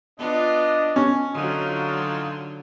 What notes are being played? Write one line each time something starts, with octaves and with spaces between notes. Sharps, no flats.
B3 D4 F4 D#5
C#4
D3 F#3 D#4 F4